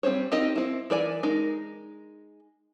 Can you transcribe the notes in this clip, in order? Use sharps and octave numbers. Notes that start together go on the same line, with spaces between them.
G3 C4 D#4 C5 C#5
C4 D#4 G4 A#4 D#5
C4 E4
E3 A#4 D5 G#5
G#3 D#4 A#4